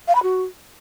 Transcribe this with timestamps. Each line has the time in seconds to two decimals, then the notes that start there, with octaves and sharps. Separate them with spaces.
0.08 F5
0.15 B5
0.23 F#4